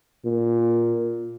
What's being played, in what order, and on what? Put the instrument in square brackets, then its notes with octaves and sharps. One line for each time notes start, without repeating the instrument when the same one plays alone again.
[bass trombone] A#2